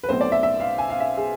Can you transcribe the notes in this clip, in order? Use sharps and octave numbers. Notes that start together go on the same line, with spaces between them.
B4
B1 B2 A3 C4 C5
D5
E5
E5
F5
G#5
F5
E5
G#4